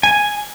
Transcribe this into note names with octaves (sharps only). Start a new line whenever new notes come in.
G#5